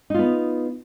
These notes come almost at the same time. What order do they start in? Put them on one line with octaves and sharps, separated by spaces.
D#4 F4 B3